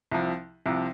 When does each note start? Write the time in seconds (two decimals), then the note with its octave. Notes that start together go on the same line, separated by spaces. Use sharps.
0.12 C2 C3 F3
0.66 C2 C3 F3